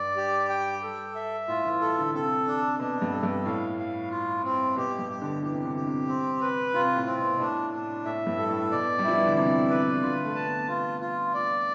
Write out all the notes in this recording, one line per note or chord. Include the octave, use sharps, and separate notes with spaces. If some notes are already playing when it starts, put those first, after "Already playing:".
Already playing: G2 D5
G4
G5
A4
E5
A2 F4
E3
A4
D3
C3 A4
D4
B2 D4
G2
A4
G2
A2 F5
F5
F4
C4
B2 G4
G2
G4
D3
E3 G4
C3
D3
G4
C3
C4
B4
C3 F4
A2
C4
B2
B2
A2 D4
D4
A2 E5
G2
A4
A2
B2 D5
G3
F3 E4
E3
D3
C3 D5
B4
D3 F4
A3
A5
B3
B3 F4
F4
D5